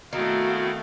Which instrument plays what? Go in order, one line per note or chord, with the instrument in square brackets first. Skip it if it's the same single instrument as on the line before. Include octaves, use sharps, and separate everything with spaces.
[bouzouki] D#3 [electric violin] A3 F5 [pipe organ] B3 C4 E4 [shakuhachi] F#4